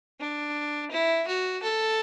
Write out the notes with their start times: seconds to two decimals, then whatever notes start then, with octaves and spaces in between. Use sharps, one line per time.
0.20 D4
0.91 E4
1.27 F#4
1.63 A4